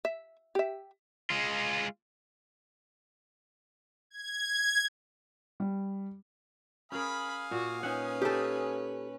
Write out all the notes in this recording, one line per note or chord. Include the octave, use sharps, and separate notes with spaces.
E5
G4 E5
G#3 F4
G#6
G3
C#4 G#4 A#4 F5 G#5 B5 D#6
A#2 F#4
C#4 D#4 B4 E5 F#5
D#4 G4 A4